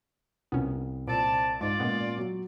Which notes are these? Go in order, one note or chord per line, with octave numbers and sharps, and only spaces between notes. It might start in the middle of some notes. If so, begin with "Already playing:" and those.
C2 B3 C#4
A#2 C4 D5 A5
G#2 G#3 F4 D5
A#2 G#3 B3 C#4
F#3